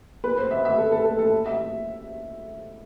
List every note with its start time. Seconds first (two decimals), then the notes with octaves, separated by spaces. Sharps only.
0.24 B4
0.38 C5
0.51 E5
0.65 E5
0.78 A4
0.92 A4
1.05 A4
1.19 A4
1.46 E5